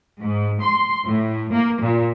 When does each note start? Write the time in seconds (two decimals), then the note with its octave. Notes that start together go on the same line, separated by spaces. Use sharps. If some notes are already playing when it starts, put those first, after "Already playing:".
0.21 G#2
0.62 C6
1.08 A2
1.53 A#3
1.81 A#2